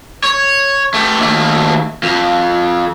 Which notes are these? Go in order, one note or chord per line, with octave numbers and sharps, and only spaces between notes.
C#5
A3 G4
D#2 A3
F2